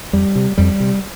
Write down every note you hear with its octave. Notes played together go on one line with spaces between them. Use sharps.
F2 G3
C3
F2 G3
C3